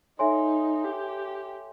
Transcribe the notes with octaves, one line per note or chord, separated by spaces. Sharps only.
D#4 A4 C#5 E5 G#5 C6
G4